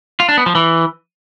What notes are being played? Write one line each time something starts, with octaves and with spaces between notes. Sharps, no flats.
F4
D4
B3
F3
E3